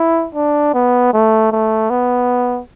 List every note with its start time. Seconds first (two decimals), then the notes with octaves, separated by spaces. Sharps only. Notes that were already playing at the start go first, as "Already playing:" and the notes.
Already playing: E4
0.35 D4
0.74 B3
1.13 A3
1.52 A3
1.90 B3